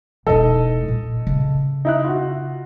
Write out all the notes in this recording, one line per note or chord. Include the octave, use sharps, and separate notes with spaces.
E1 D#4 A4 D#5
A#2
C#3
D#4 E4 F#6
F4 F#4